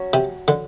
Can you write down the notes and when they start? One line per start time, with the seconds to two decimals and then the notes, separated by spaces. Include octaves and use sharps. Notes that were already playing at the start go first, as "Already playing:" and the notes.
Already playing: F#3 C#4
0.13 C3
0.48 D3